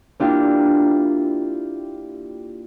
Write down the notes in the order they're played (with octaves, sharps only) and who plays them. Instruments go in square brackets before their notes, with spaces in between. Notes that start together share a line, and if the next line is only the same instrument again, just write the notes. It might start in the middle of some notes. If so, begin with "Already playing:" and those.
[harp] A#3 D4 E4 F4 G4